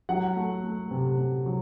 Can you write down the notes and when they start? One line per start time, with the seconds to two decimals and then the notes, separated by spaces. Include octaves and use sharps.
0.09 F#3 F#5
0.36 A3
0.63 A3
0.91 C3
1.18 C3
1.46 F#3